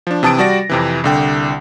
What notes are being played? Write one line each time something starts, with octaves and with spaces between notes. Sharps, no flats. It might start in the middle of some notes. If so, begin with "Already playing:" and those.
F3 D4
C3 E3 A5 D#6 A6 D7
G3 F#4 D5 A#6
F2 C3 E3
C2 D3 G5